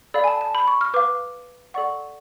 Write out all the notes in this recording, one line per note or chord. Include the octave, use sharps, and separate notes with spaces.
A4 D5 F5 B5
G#5
A5
A5
B5
C#6
F6
B4 F5 D6
A4 D5 F#5 C#6